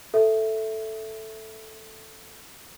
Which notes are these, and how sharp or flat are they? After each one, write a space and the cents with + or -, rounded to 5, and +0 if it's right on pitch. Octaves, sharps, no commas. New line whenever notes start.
A4 +0 E5 +0